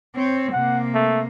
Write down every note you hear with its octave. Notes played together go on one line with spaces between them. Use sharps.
C4 C#5
C3 A#3 F#5
A3